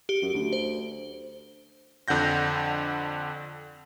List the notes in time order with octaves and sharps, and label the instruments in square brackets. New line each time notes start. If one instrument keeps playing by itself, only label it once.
[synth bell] G4
[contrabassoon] F#2 [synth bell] D7
[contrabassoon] D2
[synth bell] C5
[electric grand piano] F2 D3 F#5 G6 A#6